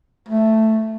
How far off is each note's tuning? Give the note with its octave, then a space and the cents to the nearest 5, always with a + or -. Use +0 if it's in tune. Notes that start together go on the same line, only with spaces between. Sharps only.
A3 +5